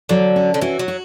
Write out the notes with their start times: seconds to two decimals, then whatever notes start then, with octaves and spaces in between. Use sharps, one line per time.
0.09 D3 F#3
0.36 C#4
0.54 D3
0.61 E3 F#4
0.79 F#3
0.88 F#4